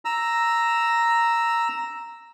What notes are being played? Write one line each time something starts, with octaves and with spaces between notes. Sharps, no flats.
A#5 E6